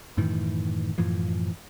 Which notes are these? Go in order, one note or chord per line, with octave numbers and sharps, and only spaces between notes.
F#2 A2 D#3 E3
F#2 A2 E3 F3